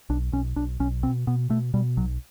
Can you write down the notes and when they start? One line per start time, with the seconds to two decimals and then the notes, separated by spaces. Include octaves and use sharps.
0.10 B1 D4
0.32 B1 C#4
0.56 B1 D4
0.80 B1 C#4
1.03 B2 C4
1.27 B2 B3
1.50 B2 A3
1.74 B2 G3
1.97 B1 F#3